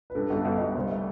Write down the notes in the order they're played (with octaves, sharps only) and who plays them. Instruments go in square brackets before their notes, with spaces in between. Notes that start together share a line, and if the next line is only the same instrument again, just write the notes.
[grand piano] B4
[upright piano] G2 [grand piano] A4
[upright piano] G1 [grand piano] A4
[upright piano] G1
[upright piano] G1 [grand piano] D#5
[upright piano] C2 [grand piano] C5
[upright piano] A3